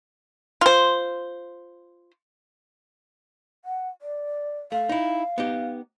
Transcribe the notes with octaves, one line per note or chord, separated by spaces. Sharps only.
F4 C5
F#5
D5
A3 F5
D#4 E4
B3 D#4 G4